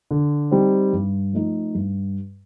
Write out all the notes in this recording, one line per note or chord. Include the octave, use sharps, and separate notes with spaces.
D3
G3 C4 D#4
G2
F3 A3 D#4
G2